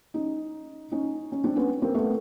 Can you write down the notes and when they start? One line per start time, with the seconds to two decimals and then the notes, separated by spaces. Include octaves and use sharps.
0.14 C#4 D#4
0.91 C#4 D#4
1.32 C#4
1.44 C4 D4
1.56 B3 C#4
1.82 A#3 C4
1.95 A3 B3